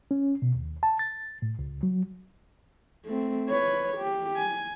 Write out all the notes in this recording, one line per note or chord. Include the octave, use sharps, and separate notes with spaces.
C#4
B2
D#2
A5
A6
A2
C#2
F#3
A3 C4
B4 C#5
G4
G#5